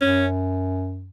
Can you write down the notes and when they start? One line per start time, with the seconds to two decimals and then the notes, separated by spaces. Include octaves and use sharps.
0.01 F#2 C#4